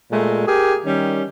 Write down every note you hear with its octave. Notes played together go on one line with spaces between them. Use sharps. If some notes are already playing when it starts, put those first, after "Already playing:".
A#2 G#3 A3
G4 G#4 A#4
D#3 G3 C#4